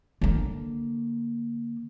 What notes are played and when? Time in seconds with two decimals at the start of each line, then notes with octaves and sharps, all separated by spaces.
0.22 D3 A#3